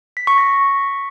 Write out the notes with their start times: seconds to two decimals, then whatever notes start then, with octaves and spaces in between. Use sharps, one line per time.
0.17 B6
0.27 C#6
0.38 A#6